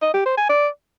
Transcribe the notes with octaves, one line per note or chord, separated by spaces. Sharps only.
D#5
G4
C5
G#5
D5